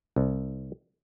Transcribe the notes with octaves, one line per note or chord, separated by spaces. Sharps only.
C2